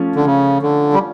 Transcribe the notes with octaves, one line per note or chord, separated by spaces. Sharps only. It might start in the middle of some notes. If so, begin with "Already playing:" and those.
Already playing: F3 A3 C#4
D3
C#3
D3
G3